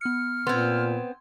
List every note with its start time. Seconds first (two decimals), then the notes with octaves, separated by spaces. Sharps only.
0.01 B3 F6 C#7
0.47 A#2 B3 C4 C6 G#6